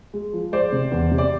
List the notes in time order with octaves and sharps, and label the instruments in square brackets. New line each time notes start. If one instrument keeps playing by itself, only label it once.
[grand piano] G#3
F3
[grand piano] G#3 [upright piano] C5 D5
[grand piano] C3
E2
C3
[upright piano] D5